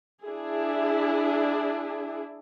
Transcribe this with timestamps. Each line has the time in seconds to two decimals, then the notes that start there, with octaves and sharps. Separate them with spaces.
0.25 D4 E4 G#4